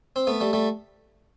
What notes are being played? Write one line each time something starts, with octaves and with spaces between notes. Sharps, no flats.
C4
A3 B3
G3 A3
G3 A3